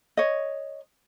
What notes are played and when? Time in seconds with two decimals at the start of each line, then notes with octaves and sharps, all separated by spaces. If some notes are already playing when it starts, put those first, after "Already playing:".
0.17 C#5 D#5